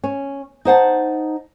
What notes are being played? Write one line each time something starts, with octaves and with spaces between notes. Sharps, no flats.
C#4
D#4 C5 F#5 A5